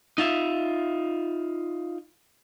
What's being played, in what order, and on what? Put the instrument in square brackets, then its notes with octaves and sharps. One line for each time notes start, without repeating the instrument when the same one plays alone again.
[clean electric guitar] D#4 F4 E5